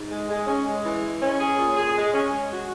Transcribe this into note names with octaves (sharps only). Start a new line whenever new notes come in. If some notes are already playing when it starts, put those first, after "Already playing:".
Already playing: G#2
G#3
G#3
C#4
G#3
E3
G#3
C#4
G#4
A#2
G#4
G#3
C#4
G#3
F#4